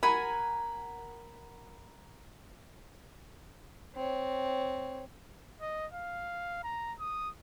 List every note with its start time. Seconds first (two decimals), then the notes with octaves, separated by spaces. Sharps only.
0.03 A#4 F#5 G#5 B5
3.95 C4 C#5
5.62 D#5
5.92 F5
6.64 A#5
7.00 D#6